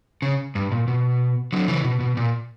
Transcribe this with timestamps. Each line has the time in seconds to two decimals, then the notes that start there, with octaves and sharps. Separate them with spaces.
0.22 C#3
0.55 G2
0.72 A#2
0.88 B2
1.53 D3 F#3
1.68 C#3 E3
1.84 B2
2.00 B2
2.17 A#2